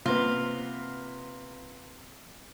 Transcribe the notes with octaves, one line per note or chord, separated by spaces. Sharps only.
C3 A#3 B3 F4